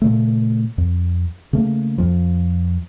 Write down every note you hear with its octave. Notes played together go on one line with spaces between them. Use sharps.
A#2 C#3 A3
F2
C#3 A3 A#3
F2 F3